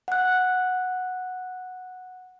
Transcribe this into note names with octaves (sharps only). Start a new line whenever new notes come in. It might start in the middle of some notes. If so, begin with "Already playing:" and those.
F#5 F#6